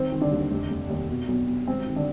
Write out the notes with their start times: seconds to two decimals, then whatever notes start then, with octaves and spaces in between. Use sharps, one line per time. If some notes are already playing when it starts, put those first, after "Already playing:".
Already playing: D#3 C4 C5
0.12 D#3
0.21 D3 D4
0.31 D#2
0.50 F1
0.70 F1
0.90 D#2
1.09 B2
1.28 B1
1.47 B2
1.67 G#1 C4
1.87 D#3
1.96 D3 D4